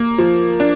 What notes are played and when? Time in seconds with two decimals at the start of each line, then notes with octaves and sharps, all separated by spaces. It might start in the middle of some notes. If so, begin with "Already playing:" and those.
Already playing: A#3
0.18 F3
0.60 D4